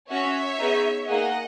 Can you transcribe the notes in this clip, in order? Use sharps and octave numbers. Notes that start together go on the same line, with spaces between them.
C#4 F#4 C#5 E5
B3 D#4 G#4
A#3 D#4 G#4 D#5 F#5